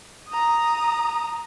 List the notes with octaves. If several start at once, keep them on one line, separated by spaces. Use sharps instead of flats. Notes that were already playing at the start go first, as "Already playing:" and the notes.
A#5 D#6